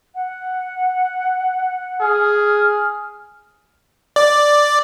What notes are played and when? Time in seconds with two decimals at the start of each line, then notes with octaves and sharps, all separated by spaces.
0.15 F#5
2.01 G#4 F6
4.16 D5